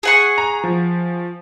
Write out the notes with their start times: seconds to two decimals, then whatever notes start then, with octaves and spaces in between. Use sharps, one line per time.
0.03 G#4 F#5 C#6
0.38 A#5
0.64 F3